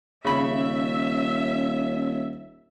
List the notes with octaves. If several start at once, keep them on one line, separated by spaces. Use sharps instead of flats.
D#1 C#3 C#4 E5 B5